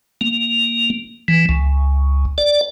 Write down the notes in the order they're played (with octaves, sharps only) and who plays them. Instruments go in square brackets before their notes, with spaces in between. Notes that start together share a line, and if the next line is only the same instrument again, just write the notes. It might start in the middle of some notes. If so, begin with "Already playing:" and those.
[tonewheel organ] A#3
E3
C#2
D5